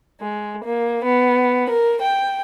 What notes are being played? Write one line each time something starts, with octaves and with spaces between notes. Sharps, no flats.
G#3
A#3
B3
A#4
G5